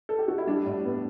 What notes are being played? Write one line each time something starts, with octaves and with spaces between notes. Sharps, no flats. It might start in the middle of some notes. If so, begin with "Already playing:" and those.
A4
G4
F#4
E4
G3 D4
A2
B3